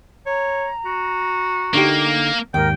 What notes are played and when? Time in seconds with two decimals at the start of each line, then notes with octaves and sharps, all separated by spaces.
0.26 C#5 A#5
0.86 F#4
1.74 D3 A#3 D#4 G4
2.54 D#2 G#2 A#4 G5